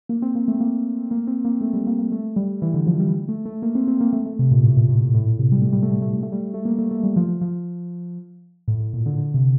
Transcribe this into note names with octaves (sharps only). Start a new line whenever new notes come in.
A#3
C4
A#3
A3
A#3
A#3
C4
A#3
A3
G3
A#3
A#3
A3
G3
E3
D3
F3
G3
A3
A3
A#3
C4
C4
A#3
A3
A3
C3
A#2
A2
A#2
A2
A#2
A2
A#2
C3
G3
A3
G3
A3
G3
A3
G3
A3
G3
A3
A#3
A3
A3
G3
F3
F3
F3
A2
A2
A#2
D3
D3
C3